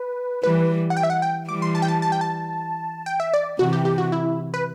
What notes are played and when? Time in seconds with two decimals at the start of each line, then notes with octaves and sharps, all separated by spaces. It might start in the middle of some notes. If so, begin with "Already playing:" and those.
Already playing: B4
0.44 E3 G3 B4
0.90 F#5
0.97 G5
1.03 E5
1.10 F#5
1.22 G5
1.49 E3 G3 D6
1.62 C6
1.75 A5
1.82 G5
1.88 A5
2.02 A5
2.12 G5
2.21 A5
3.06 G5
3.20 E5
3.34 D5
3.59 C3 E3 F#4
3.73 G4
3.85 G4
3.98 F#4
4.12 E4
4.54 B4